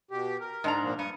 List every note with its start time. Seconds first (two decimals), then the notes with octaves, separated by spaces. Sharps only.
0.11 B2 G4
0.41 A#4
0.64 G#2 D4 A#5
0.83 A#2 F3 A#3
0.99 G2 C#6 D#6